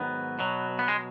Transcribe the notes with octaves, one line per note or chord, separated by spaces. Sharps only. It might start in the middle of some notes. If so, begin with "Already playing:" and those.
Already playing: G#2 D#3 F#3 B3
B2 F#3
B3
G#3